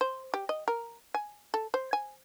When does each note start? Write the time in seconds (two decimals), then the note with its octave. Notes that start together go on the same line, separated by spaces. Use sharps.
0.01 C5
0.34 G4
0.49 D#5
0.68 A#4
1.14 G#5
1.54 A4
1.74 C5
1.93 G#5